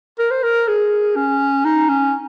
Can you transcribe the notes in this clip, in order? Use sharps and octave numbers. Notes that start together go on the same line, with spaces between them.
A#4
C5
A#4
G#4
C#4
D#4
C#4